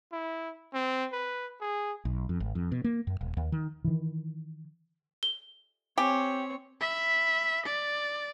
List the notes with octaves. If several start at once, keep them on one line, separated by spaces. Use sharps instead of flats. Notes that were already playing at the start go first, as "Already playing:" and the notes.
E4
C4
B4
G#4
B1
F2
G#1
F2
B2
A#3
F#2
D#1
D#2
D#3
D#3 E3
G7
C4 G4 C#5 G#5
E5 B5
D5